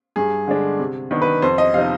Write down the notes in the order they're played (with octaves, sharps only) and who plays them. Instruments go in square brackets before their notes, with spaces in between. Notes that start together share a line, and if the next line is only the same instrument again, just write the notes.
[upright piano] G2 G#4
D3 G#3 D4
C3
D#3 B3 D4
B4
F2 C5
D#5
C3 F3 C4 D#4 F5